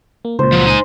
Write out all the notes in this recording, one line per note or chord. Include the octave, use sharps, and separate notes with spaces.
A#3
C#2 A#2 C5
F3 F#3
D#4 G#5